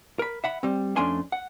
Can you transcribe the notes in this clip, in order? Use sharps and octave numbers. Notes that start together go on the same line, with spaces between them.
A#4 B5
E5 F#5 B5
G3 C4
F2 A3 C#4 D4 G#5 C6
F#5